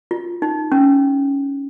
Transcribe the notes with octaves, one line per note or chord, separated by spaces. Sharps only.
F4
D#4
C#4